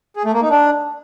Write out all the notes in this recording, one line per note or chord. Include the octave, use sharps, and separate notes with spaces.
G#4
A3
A#3
D#4
D4